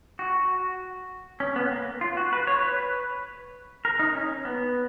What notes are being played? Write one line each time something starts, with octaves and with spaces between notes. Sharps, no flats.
F#4
C#4
B3
A#3
F4
F#4
B4
C#5
B4
A#4
D#4
C#4
B3